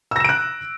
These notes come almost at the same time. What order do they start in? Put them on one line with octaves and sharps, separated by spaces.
E6 A#6 E7 D7 F#6